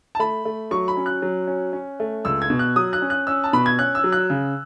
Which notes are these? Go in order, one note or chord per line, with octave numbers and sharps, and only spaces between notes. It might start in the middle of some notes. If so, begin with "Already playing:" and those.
A5
A3 B5
A3
F#3 C#6
B5
C#4
F#6
F#3
C#4
C#4
A3
C#2 E6
G#6
B2
F#6
F#3 D#6
F#6
C#4
F#6
C#4 E6
A5
B2 B5
G#6
C#4 F#6
E6
F#3
F#6
C#3